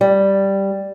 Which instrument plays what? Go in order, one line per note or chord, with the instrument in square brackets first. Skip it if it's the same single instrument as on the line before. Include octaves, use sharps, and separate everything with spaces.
[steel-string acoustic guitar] G3